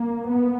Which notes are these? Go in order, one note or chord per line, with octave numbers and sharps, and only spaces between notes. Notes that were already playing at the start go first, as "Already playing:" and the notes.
Already playing: A#3
B3